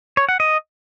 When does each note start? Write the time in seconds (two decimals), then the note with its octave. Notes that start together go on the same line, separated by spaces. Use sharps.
0.17 C#5
0.29 F#5
0.40 D#5